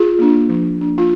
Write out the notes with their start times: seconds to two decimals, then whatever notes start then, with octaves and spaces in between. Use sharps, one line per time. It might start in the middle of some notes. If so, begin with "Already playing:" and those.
Already playing: F4 G#4
0.19 A#3 D4
0.49 F3
0.78 A#3 D4
0.98 F4